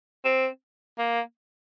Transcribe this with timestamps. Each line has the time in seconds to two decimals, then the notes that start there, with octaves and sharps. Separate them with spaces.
0.25 C4
0.98 A#3